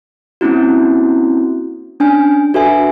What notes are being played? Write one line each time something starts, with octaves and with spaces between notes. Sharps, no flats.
A#3 C4 C#4 E4 F#4
C#4 D4 G#5
D4 F#4 A4 B4 E5 G#5